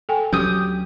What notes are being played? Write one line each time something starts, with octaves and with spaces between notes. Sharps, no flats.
A4 G5 G#5
D2 F#3 C#4 G4 D#6 G6